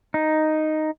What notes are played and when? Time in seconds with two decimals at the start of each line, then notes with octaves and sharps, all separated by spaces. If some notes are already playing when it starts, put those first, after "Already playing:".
0.14 D#4